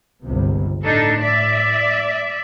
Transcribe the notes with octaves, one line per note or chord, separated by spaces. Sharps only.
G1 C#2 C3
A2 D4 D#4 A4
D5 E5